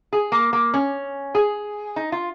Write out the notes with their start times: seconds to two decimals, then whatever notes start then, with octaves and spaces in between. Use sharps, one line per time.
0.13 G#4
0.32 A#3
0.53 A#3
0.74 C#4
1.35 G#4
1.96 D#4
2.12 F4